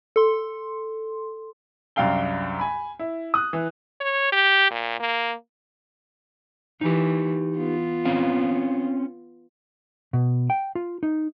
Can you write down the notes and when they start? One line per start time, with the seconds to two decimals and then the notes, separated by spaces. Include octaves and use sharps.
0.16 A4 C6
1.96 C2 F#2 D4 F5 G5 G7
2.60 G#5 B5
2.99 E4
3.34 D#6 F#6
3.53 E3
4.00 C#5
4.32 G4
4.71 A#2
5.00 A#3
6.81 E3 D#4 G4
7.56 B3 F4
8.05 C4 C#4 F5
10.13 B2
10.50 G5
10.75 F4
11.03 D#4